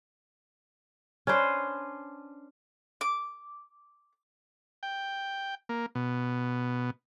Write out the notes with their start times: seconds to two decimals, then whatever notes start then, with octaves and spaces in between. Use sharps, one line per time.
1.27 C#4 D4 B4 C5
3.01 D6
4.83 G5
5.69 A#3
5.95 B2